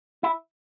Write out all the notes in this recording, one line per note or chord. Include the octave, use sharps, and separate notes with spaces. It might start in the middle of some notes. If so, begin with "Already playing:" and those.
E4